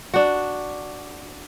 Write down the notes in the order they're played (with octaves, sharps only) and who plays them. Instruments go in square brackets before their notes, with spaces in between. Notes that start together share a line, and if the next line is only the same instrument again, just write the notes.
[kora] D4 F#4